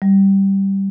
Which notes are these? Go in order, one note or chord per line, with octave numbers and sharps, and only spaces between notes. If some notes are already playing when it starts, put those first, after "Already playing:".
G3